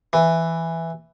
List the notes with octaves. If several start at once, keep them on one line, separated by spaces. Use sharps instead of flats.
E3